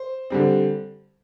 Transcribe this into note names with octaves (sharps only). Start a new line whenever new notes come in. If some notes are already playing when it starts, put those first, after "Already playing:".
Already playing: C5
D3 G3 C4